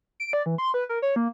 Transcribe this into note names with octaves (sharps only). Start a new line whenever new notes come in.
D7
D5
E3
C6
B4
A#4
C#5
A#3